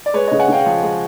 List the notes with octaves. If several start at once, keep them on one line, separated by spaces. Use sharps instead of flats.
D5
G#3 B4 C#5
C#3 C#5 D#5
F#5 G#5
C#3 F5 G5
F3
G#3